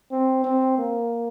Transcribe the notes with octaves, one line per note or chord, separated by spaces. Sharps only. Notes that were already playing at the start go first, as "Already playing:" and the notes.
C4
C4
A#3